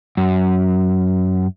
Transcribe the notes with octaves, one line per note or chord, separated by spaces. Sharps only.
F#2